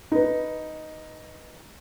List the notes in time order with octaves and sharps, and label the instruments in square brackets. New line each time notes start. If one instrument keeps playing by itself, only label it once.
[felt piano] D#4 B4